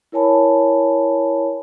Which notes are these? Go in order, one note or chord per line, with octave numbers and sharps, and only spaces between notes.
E4 A#4 C#5 G#5 A5 B5